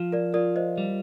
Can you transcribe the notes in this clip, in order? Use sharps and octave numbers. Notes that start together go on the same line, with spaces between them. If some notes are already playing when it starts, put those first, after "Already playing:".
Already playing: F3
A#4 D5
F4 A#4 D5
C5 D#5
G3